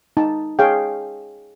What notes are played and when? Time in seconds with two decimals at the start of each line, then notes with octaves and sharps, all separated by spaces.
0.17 D#4 A5
0.59 G#4 C#5 F5 G5